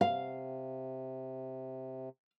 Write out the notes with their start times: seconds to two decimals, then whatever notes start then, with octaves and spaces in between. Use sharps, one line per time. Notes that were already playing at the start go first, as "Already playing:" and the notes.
0.01 C3 F5